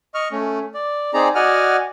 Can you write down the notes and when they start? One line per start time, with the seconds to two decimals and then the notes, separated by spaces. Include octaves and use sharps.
0.14 D#5 C#6 F6
0.32 A3 C#4
0.74 D5
1.14 C4 D#4 G#4 D5 A#5
1.35 F#4 D5 D#5 F#5 G#5 F6